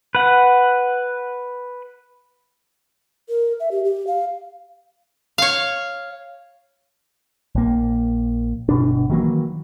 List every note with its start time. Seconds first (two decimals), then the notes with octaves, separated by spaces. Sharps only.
0.15 B4 F#5
3.29 A#4
3.60 E5
3.71 G4
3.85 G4
4.07 F5
5.38 C#5 F5
7.55 A#1 A#3
8.69 G1 B2 D4
9.10 D#3 E3 F#3 A#3